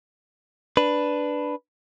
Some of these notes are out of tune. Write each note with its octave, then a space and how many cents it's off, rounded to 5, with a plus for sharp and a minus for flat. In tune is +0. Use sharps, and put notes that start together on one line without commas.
D4 +0 B4 +0